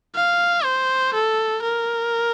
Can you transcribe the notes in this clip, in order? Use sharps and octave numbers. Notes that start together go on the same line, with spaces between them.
F5
C5
A4
A#4